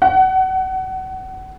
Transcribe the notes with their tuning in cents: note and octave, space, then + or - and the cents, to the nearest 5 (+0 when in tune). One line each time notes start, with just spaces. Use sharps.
F#5 +30